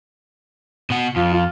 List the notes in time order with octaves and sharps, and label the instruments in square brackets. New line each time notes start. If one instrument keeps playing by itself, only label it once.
[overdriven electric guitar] B2 F#5
[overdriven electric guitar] F2 [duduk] F4
[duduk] F4